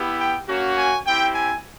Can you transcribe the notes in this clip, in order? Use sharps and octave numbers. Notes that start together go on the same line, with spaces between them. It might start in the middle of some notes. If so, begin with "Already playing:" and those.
Already playing: B3 E4 G4
G5
A#3 C#4 F#4
G#5
C4 E4 G4 G5
G#5